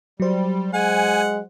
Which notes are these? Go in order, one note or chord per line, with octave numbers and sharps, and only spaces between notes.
F#3 G3 C5
G#3 F#5 G#5